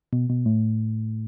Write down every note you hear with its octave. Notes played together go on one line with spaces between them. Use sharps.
B2
B2
A2